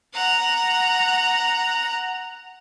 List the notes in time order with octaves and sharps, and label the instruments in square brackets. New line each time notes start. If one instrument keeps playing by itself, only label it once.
[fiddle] F#5 A#5